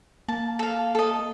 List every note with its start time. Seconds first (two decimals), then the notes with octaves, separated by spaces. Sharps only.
0.28 A#3 A5
0.59 A4 F5
0.95 A4 D#5